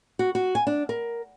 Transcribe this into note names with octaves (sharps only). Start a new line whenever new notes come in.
F#4
F#4
G#5
D4
A#4